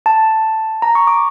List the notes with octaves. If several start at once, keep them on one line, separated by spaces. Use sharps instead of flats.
A5
A#5
C#6
D6